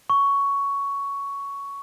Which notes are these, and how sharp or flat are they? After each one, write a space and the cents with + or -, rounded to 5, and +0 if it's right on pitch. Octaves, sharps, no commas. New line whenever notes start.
C#6 +10